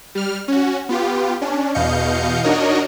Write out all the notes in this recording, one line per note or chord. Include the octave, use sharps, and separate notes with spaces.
G3 F6
C#4 F#4
B3 F4 G4
C#4 D4
E2 B2 D#5 F5 G6 C#7
D4 D#4 F#4 A#4 C#5 D#5